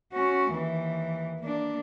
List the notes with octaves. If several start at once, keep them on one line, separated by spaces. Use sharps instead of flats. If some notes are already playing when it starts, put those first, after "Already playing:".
C#4 F#4
D#2 E3
A#3 D4